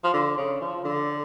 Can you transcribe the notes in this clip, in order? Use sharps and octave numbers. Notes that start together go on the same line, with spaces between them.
F3
D3
C#3
F3
D3